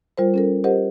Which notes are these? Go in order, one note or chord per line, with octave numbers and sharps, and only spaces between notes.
G3 F4 A#4 C5
C#4 A4 A#4
G4 A#4 C5 D#5 F#5